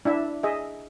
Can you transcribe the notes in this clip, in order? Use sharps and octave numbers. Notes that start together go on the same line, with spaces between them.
D4 E4 E5
G#4 D#5 E5